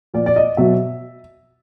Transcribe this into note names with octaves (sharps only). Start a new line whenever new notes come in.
A#2 F3 D5
D5
D#5
B2 F#3 E5